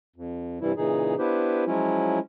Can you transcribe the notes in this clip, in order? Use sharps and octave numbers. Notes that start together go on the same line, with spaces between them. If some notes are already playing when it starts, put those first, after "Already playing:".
F2
G2 C3 E3 G3 E4
A#2 C#3 E3 D#4 G#4
B3 D4 E4 G4 B4 C5
F3 F#3 G#3 C#4 E4 F4